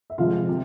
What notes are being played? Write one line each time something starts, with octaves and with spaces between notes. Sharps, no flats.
E5
C3 F3 G#3 F4 F5
C3